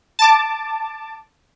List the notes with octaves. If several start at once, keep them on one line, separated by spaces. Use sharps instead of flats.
A5 D6